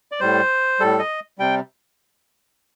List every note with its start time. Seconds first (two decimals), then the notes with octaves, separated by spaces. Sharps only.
0.12 D5
0.20 A2 G3 C5
0.80 A2 G3 A4
0.99 D#5
1.38 C3 G3 G5